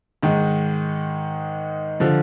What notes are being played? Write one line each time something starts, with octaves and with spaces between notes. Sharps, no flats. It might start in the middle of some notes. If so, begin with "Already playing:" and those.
G#2 D#3 G#3
D3 F3